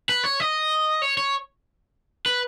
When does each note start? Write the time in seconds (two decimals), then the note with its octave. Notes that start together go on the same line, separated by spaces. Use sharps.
0.09 B4
0.24 C#5
0.40 D#5
1.02 C#5
1.18 C#5
2.26 B4